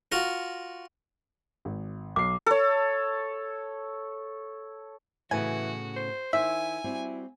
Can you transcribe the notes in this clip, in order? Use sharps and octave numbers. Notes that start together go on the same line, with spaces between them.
F4 F#4 A#4
G#1
B1 D6 C7
A4 C#5
A2 C#3 E3 B3 F#4 G#5
C5
D#3 E4 C5 E5 G#5
G3 C4 E4 F#4